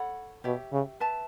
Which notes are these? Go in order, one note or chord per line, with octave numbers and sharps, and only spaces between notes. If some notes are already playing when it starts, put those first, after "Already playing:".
Already playing: A4 C#5 F#5 B5
B2 G4 C#5 E5
C#3
B4 E5 A5